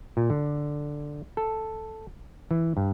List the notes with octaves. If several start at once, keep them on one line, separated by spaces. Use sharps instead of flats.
A#2
D3
A4
E3
G2